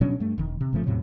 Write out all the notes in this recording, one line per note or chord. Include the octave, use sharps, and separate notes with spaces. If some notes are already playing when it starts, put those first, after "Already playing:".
B2 F#3 C#4 D4
G2 A3
E1 D#3
C3
G#1 C#3 F3 A3
E2 A2 C3 F#3